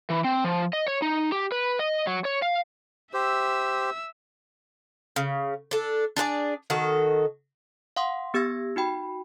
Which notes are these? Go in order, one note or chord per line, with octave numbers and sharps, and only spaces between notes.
E3
C4
F3
D#5
C#5
D#4
G4
B4
D#5
F#3
C#5
F5
G4 C5 E5 E6
C#3
D4 A4
D4 G#4 B4 D5
D#3 F#4 A4
F5 F#5 C6 D#6
B3 G4 E6 G#6 A#6
D#4 F#4 G5 B5